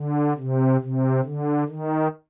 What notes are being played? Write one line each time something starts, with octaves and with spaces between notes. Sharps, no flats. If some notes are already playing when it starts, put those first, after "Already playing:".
Already playing: D3
C3
C3
D3
D#3